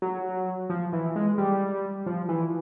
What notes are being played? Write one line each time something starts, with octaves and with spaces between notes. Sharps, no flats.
F#3
F3
E3
G#3
G3
F3
E3